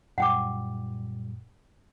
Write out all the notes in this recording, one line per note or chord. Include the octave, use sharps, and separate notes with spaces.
F#2 A#2 G3 F#5 G5 D6